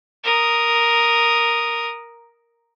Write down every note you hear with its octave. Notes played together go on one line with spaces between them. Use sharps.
A#4 D#6